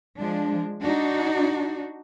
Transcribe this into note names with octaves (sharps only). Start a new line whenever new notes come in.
F3 G#3 D4
D4 D#4 F#4